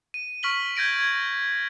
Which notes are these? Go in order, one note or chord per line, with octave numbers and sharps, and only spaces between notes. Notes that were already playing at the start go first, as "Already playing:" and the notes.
D#7
C#6 F6 B6 F#7 G7
G6 G#6 A#6 D7 D#7
G#6